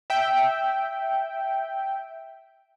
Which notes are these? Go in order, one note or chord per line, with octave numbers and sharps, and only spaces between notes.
E5 G5